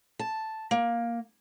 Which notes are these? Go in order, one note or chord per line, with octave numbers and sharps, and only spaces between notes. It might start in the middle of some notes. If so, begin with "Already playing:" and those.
A5
A#3